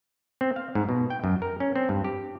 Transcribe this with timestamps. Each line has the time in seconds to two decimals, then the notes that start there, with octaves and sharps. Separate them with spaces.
0.41 C4
0.56 F5
0.75 G#2
0.89 B2
1.10 G5
1.24 F#2
1.42 A#4
1.60 C#4
1.76 C4
1.89 G2
2.04 G4